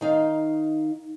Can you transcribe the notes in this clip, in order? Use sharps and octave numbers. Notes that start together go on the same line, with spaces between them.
D#3 D#4 F5